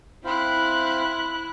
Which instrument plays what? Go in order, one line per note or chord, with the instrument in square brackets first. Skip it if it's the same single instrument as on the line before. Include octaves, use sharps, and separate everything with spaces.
[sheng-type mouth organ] C4 C5 F5 [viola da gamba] E4 [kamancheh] B5 F#6